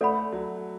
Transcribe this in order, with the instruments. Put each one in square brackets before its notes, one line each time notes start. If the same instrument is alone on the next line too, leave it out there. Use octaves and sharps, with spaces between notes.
[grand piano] A3 [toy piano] A4 D5 F#5 B5
[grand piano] F#3